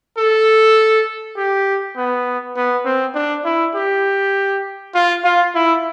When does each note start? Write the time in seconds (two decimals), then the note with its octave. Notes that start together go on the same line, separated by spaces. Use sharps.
0.17 A4
1.37 G4
1.97 B3
2.56 B3
2.85 C4
3.15 D4
3.45 E4
3.75 G4
4.95 F4
5.24 F4
5.55 E4